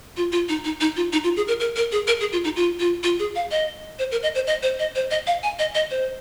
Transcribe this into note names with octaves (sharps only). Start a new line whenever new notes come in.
F4
F4
D#4
D#4
D#4
F4
D#4
F4
G#4
A#4
A#4
A#4
G#4
A#4
G#4
F4
D#4
F4
F4
F4
G#4
F5
D#5
C5
A#4
D#5
C5
D#5
C5
D#5
C5
D#5
F5
G#5
D#5
D#5
C5